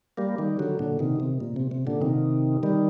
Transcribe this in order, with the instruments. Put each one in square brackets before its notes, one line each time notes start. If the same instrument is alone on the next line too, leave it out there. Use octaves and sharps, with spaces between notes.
[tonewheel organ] G3 A#3
D#3 G3
D3 F#3
A#2 D3
C3 D#3
C3
A#2
C3
C3
A#2 D3
C3 D#3
D#3 G3